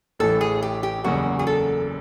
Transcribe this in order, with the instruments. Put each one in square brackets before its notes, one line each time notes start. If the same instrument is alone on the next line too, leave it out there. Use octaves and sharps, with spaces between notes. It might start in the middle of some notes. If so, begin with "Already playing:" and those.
[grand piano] A1 A2 E3 A3 [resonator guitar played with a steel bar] A4
[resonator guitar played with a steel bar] G#4
G4
G4
[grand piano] F#1 E2 C#3 F#3 A#3 [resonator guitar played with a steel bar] F#4
[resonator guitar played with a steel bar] G#4
A4